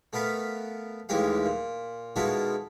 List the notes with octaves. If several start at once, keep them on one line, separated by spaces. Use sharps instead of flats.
A3 B3 A#4 B4 F5
A1 D#2 E3 G#3 G4 F5
A#2
B2 D#3 G#3 E4 F4 A4